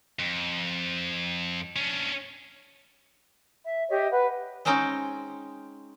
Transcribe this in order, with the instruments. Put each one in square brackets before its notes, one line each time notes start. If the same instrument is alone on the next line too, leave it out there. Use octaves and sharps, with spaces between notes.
[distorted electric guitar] F2
C#4 D4
[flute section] E5
G4 C#5 D#5 E5
B4 F#5
[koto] G#3 C4 C#4 D#4 G5